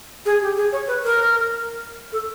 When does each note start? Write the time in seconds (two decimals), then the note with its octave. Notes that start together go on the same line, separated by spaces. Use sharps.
0.25 G#4
0.41 G4
0.57 G#4
0.72 C#5
0.87 B4
1.03 A#4
2.12 A4